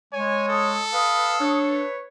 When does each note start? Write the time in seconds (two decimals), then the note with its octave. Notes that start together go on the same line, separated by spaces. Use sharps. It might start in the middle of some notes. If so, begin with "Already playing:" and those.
0.13 G#3 C#5 G#5
0.49 A4 D#6
0.93 B4 F5 D#6
1.40 D4 C#5
1.69 B4